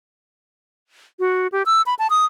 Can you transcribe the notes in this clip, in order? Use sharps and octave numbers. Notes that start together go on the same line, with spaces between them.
F#4
G4
E6
B5
A5
D#6